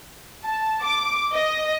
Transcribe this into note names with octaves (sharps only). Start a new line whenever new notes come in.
A5
D6
D#5